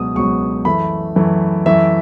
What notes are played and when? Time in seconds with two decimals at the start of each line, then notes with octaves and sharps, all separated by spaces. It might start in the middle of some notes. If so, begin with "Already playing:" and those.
Already playing: C#2 B2 F#3 D#6
0.15 C#2 B2 F#3 C#6
0.65 F#2 E3 A3 B5
1.16 F#2 E3 A3
1.66 F#2 E3 A3 E5